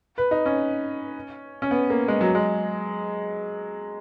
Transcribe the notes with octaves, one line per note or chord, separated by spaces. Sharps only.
B4
D#4
C#4
C#4
B3
A#3
G#3
F#3
G#3